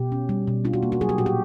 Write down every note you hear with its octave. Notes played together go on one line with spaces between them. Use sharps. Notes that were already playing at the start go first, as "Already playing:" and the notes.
Already playing: B2 G4
C#4
G3
B2
D4 F4
F#4
A#3
F#4
F#3 G#4
G4
A#2 F#4
G4